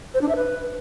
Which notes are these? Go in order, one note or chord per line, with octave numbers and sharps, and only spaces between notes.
C5
D4
E5
B4